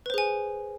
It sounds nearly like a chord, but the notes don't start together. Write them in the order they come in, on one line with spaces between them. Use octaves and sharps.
B4 C5 G#4 G#5